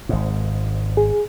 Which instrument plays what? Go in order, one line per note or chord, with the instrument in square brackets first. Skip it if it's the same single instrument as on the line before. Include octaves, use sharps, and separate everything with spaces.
[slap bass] G#1 G#2
[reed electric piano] G#4